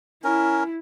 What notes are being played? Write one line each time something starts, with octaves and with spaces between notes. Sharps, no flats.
C#4 E4 A#4